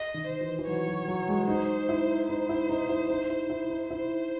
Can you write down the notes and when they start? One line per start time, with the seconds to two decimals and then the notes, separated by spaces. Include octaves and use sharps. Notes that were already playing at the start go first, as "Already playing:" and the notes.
Already playing: D#5
0.14 D#3
0.27 C5
0.41 E3
0.59 E3
0.67 F#3 C#5
0.87 F#3
1.08 F#3
1.28 G#3
1.48 D#4 C5
1.89 E4
2.29 D#4 C5
2.49 E4
2.69 D#4
2.89 E4
3.10 D#4
3.30 E4
3.50 E4
3.70 D#4
3.90 E4 C5